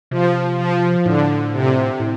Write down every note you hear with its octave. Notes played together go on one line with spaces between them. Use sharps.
C3 F3
F3
A2 D3
C3
A2